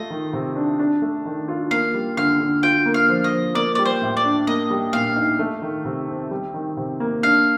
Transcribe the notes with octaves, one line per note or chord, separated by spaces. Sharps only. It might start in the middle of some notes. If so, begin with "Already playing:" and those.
Already playing: A3 F4 D#5
D#3
C3
D4
D4
A3
D#3
F4
A#3 F5
G3
D3 F5
D3
F4 G5
A#3
F5
F3
D#5
F3
A#3 D5
G3 D5
C5
A2
D5
D4
A#3 D#5
G3
A#2 F5
D#4
A3
D#3
C3
C4
G3
D#3
C3
A#3
D4 F5